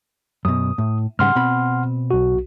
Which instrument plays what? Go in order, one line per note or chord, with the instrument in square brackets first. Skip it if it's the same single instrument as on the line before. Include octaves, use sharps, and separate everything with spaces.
[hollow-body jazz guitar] F#2 B2 [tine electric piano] D#6
[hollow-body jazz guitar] A2
[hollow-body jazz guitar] G#2 C#3 G3 [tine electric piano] F#5 C6 F6
[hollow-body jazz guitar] B2 C4 B5
[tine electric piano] B1 F#4